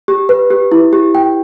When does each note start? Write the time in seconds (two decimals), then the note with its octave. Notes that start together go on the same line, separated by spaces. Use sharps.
0.08 G4
0.29 B4
0.50 G4
0.72 E4
0.93 G4
1.15 G5